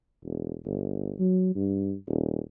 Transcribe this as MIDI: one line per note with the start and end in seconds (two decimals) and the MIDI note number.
0.24 0.56 28
0.65 1.14 31
1.19 1.54 54
1.55 1.94 43
2.07 2.40 27